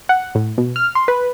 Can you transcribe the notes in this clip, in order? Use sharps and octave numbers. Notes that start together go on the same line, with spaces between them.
F#5
A2
B2
F6
C6
B4